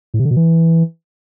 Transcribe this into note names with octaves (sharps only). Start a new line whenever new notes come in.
A2
C3
D3
B2
E3